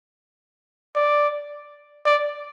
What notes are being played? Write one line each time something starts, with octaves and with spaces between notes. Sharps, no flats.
D5
D5